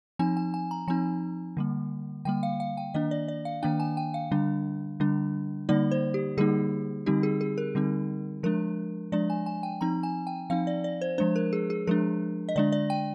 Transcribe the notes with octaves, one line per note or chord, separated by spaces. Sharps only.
F3 C4 D#4 G#5
G#5
G#5
A#5
F3 C4 D#4 G#5
D3 G3 A#3
D3 G3 A#3 G5
F5
F5
G5
D#3 A#3 D4 D#5
D5
D5
F5
D#3 A#3 D4 G5
G#5
G5
F5
D3 G3 D4
D3 G3 D4
D3 G3 A#3 D#4 D5
C5
G4
D3 G3 A#3 D#4 G#4
D3 G3 C4 D#4 G4
G#4
G#4
A#4
D3 G3 C4 D#4
F3 G#3 D4 A#4
F3 G#3 D4 D5
G#5
G#5
G5
F3 C4 D#4 A#5
G#5
G5
F3 C4 D#4 F5
D5
D5
C5
F3 G#3 D4 C5
A#4
G#4
G#4
F3 G#3 D4 A#4
D#5
D3 G#3 D4 D5
D5
G5